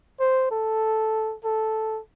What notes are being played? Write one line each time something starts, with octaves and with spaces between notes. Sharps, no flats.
C5
A4
A4